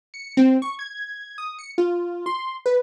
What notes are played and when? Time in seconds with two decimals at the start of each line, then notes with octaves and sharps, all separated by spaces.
0.14 C#7
0.37 C4
0.62 C#6
0.79 G#6
1.38 D#6
1.59 C#7
1.78 F4
2.26 C6
2.66 B4